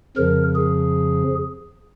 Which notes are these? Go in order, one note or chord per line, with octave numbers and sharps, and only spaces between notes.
F2 C#3 F3 A#4
G#4